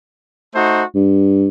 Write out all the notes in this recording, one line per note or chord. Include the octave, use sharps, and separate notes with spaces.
A3 D#4 F#4 C5
G2